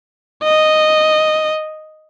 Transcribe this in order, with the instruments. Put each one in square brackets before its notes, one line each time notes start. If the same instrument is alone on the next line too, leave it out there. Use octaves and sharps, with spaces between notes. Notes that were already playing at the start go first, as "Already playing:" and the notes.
[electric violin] D#5